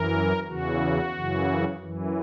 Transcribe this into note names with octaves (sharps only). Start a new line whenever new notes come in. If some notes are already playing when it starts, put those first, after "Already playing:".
Already playing: F#2 E3 A#4
E2 C#3 E3 F#4
F#2 C#3 E3
F#2 E3